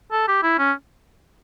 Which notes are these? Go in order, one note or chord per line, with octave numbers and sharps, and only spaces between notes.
A4
G4
E4
C#4